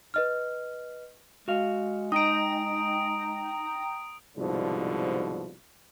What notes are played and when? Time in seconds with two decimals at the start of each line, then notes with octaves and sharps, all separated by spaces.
0.14 B4 D#5 F6
1.48 G#3 F#4 F5
2.12 D#4 G5 A#5 D#6 D7
4.37 C2 G#2 B2 D3 F3